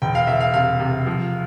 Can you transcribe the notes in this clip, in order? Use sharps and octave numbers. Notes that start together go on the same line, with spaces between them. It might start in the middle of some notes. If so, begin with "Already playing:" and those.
E1 G5
F5
E1 E5
F5
C3 F5
C3
F3